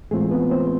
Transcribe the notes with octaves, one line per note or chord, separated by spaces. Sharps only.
A2 E3 G#3 A3 C4 F4 G#4
B3 B4
C4 C5